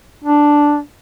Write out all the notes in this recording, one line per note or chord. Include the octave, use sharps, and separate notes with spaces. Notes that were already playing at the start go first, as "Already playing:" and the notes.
D4